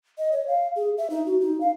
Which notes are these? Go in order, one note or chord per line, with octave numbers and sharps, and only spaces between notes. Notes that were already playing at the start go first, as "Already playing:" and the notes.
D#5
C#5
F5
G#4
E5
D#4
F#4
D#4
F5